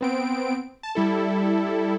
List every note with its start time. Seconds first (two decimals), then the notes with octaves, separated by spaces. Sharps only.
0.01 B3 C4 D7
0.83 A5
0.95 G3 E4 A4